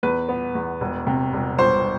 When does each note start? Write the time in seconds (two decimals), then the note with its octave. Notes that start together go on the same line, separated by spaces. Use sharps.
0.03 E2 B4
0.29 B3
0.55 E2
0.81 E1
1.07 C3
1.33 E1
1.59 G1 C5